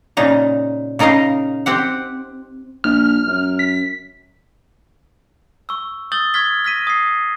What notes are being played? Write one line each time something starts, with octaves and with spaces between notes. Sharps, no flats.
A#2 C#3 D#4
C#3 D#4 A#4 D#5 F5
C4 G4 F#5
A#1 F6
F#2
B6
C#6 E6
D#6 E6 G6 A6 F#7 G7
C#6 F6 G#6 B6 G7
F6 A#6 B6 D#7
D#6 C7